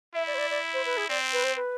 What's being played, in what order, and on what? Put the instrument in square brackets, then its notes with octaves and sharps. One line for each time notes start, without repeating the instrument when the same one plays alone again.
[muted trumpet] E4 [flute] E5
[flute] D5
C5
D5
D5
C5
B4
G#4
[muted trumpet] C4 [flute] D5
[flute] B4
C5
B4